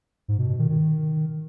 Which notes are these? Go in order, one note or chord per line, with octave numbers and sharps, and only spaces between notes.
G#2
B2
B2
D#3
D#3